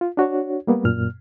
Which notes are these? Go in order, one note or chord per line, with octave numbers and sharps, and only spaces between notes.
F4
D4 F#4 C#5
G3 A#3 B3
F#2 A#2 F6